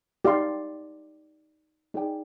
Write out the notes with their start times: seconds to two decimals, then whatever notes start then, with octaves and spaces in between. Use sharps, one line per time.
0.25 D#4 G4 D5 F5 C6
1.94 D#4 G#4 D5 G5